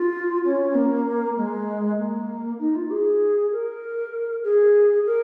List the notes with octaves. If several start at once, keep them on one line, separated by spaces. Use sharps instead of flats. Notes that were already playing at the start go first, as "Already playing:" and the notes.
Already playing: F4
C#4
A#3
G#3
A#3
D#4
F4
G#4
A#4
G#4
A#4